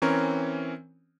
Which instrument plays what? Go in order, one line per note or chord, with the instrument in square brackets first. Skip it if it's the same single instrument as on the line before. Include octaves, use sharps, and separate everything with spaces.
[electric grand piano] E3 C4 C#4 A#4 C#5